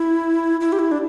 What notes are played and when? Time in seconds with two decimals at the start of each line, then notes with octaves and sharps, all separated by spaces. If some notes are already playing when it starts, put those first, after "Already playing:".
Already playing: E4
0.61 E4
0.72 G4
0.79 E4
0.92 D4